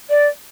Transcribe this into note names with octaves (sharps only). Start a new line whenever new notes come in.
D5